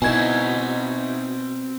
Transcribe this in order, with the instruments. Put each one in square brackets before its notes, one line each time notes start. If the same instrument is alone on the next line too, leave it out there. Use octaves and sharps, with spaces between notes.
[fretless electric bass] B2 [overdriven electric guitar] C4 A#4 [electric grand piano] D#4 E4 F#4 [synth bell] G#5 G#6